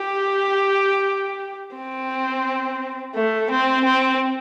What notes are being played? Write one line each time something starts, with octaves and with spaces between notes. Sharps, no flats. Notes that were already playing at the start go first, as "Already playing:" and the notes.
Already playing: G4
C4
A3
C4
C4